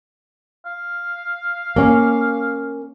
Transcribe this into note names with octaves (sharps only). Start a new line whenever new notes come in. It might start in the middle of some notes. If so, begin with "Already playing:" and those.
F5
A#3 C#4